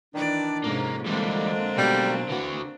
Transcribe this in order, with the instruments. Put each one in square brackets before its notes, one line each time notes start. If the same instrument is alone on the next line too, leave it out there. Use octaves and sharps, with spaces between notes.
[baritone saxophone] D#3 [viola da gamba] E3 D5 [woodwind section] D4
[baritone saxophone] F2 [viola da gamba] G#2 C3 C#4 [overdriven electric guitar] A#3
[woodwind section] D3 G#3 [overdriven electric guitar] E3 G3 [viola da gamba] A#3 C4 D4
[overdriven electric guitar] B2 F#3 [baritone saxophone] G3
[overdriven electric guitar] D3 F#4 [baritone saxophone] E3